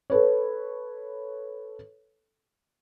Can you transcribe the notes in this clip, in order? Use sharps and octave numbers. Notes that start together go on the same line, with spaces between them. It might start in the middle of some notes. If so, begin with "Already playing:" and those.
A4 B4 C#5